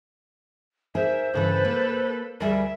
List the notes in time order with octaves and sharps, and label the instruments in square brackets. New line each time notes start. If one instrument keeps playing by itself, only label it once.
[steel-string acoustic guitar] D#4 G#4 A#4 [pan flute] C5 [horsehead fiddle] E5
[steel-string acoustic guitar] G2 C#3 E3 [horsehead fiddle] A4 B4
[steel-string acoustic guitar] A#3
[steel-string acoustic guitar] D2 G#4 A#4 [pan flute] G3 [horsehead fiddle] E5